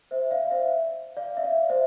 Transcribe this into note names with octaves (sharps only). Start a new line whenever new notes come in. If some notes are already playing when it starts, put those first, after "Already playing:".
C5 E5
D5 F5
F5
C5 E5
D5 F5
E5
D5 F5
C5 E5